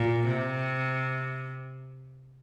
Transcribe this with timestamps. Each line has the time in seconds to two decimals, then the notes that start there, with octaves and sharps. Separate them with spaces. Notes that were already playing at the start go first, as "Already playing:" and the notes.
Already playing: A#2
0.27 C3